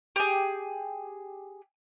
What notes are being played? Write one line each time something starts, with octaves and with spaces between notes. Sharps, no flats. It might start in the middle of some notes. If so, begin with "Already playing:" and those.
G4 G#4